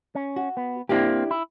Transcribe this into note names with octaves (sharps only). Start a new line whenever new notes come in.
C#4
F#4
B3
A#3 C4 D4 E4 G4
E4